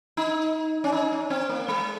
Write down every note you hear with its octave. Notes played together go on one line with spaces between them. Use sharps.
D#4
C#4
D#4
C#4
C4
A#3
G#3